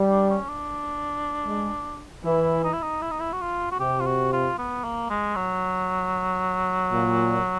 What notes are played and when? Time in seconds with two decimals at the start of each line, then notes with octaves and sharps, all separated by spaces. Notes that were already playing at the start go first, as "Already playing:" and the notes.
Already playing: G3
0.10 D4
0.30 C#4
0.49 D4
1.46 G#3
2.25 E3 E4
2.64 D#4
2.73 E4
2.82 D#4
3.02 E4
3.11 D#4
3.20 E4
3.33 F#4
3.41 F4
3.72 F#4
3.80 C3 G4
4.00 F4
4.06 F#4
4.33 F4
4.58 B3
4.84 A#3
5.10 G#3
5.36 F#3
6.92 A#2